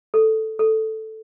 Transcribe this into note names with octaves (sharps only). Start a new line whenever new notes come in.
A4
A4